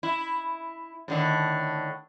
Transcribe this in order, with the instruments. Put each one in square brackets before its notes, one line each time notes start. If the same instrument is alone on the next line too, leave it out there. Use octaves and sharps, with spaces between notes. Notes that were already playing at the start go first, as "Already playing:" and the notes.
[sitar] E4
A2 D3 D#3